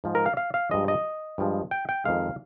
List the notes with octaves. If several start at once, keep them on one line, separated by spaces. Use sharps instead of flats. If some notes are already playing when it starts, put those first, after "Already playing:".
G#2 F3 G#3
A#4
F5
F5
F5
G2 F3 G#3 D#5
D#5
G2 F3 G#3
G5
G5
F2 D#3 G#3 F5